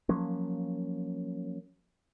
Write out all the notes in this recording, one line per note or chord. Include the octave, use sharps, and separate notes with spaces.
F3 F#3 A#3 C#4